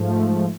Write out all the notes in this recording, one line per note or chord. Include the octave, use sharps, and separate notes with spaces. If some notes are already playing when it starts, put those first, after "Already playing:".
Already playing: G#2 F3 A3